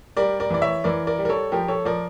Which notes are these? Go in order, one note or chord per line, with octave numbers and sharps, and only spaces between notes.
G3 A#4 D5
A#4 D5
E3 D5
C#5 E5
E3 A#4 D5
A#4 D5
G3
A#4
A4 C#5
F3 G4 A#4
A4 C#5
F3 A#4 D5